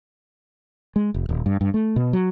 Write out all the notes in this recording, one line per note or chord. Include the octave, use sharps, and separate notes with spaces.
G#3
F1
D#1
G2
G2
A3
B2
F#3